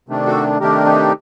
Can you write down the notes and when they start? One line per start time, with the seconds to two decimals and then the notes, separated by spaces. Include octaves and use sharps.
0.08 C3 D#3 A3 D4
0.26 F#4 A4
0.60 C3 D#3 A3 D4 G4 A#4
0.86 D#4 G4